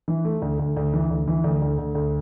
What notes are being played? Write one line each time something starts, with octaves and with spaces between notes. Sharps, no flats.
E3
A3
D2
D2
D2
E3
D2
E3
D2
D2
D2
D2